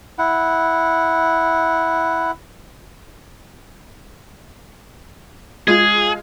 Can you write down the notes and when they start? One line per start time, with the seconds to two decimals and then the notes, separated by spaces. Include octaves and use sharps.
0.19 E4 F#5
5.68 G#3 F4 G#4 G#6